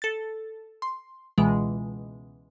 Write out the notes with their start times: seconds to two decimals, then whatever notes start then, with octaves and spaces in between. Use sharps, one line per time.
0.02 A4 A6
0.82 C6
1.38 C#2 B2 E3 G#3